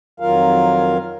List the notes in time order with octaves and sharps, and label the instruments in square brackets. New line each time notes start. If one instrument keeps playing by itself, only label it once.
[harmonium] F2 D#3 F#3 F4 A#4 F5